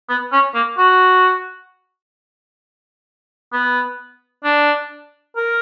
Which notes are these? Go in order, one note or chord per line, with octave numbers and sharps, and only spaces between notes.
B3
C#4
A#3
F#4
B3
D4
A#4